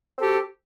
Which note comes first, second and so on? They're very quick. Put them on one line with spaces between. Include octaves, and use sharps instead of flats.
C4 A4 G4 F#4